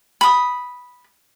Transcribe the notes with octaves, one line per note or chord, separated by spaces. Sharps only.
B5 D#6